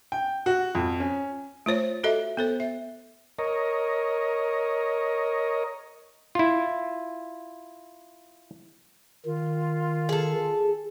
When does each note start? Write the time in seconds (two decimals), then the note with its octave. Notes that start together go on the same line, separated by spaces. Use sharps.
0.12 G5
0.46 F#4
0.75 F2
1.00 C#4
1.66 A3 F4 C5 C#5
2.04 F#4 A4 D#5 E5
2.37 B3 A4 C5
2.60 E5
3.39 A#4 C#5 D#5
6.35 E4 F4
9.25 D#3 F4
10.09 G#4 A4